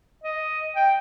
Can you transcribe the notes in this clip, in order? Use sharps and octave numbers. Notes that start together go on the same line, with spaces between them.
D#5
G5